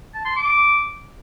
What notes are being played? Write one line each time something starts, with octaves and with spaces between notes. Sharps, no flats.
A5
C6
D6